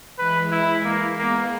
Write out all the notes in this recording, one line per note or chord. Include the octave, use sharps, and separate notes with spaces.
E3 G#3 B4
E4
A#3
G#3 A#3 B3